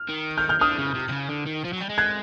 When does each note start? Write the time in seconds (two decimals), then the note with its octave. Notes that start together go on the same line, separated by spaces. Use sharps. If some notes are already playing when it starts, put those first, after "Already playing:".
Already playing: F6
0.09 D#3
0.38 F6 G6
0.49 F6 G6
0.61 D3 D#6 F6
0.78 C#3
0.95 C3
1.09 C3
1.12 C#3
1.29 D3
1.46 D#3
1.65 F3
1.73 F#3
1.81 G3
1.90 G#3
1.98 F#6 G#6